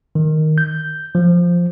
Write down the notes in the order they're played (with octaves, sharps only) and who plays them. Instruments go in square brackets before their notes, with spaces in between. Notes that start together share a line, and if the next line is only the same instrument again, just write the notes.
[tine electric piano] D#3
G6
F3